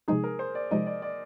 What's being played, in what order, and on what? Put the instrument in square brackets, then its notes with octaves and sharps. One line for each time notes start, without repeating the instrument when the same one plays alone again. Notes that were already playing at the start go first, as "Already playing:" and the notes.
[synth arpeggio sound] C3 F3 G#3 D#4 [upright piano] G#4
[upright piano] A#4
C5
D5
[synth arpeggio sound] C3 F3 G#3 D#4 [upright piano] D#5
[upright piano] D5
D5